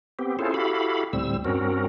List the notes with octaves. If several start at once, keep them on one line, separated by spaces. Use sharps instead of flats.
B3 C4 G4
C#4 E4 F4 G#4 A4 C5
E4 F#4 G4 A4 F5 B5
D2 A2 G3 C4 E6
G2 C4 C#4 F#4 A#4